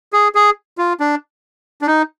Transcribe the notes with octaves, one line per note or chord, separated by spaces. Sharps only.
G#4
G#4
F4
D4
D4
D#4